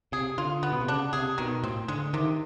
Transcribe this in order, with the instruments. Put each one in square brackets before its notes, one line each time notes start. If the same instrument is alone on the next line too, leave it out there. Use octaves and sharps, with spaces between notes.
[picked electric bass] C3 [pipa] G#4
[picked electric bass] D3 [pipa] F4
[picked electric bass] D3 [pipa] B3
[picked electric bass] B2
C3
[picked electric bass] C#3 [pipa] D4
[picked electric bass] C3 [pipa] G#4
[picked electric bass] B2 [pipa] D#3
[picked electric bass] A2 [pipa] C4
[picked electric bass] D3 [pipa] G#3
[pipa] C3 [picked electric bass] D#3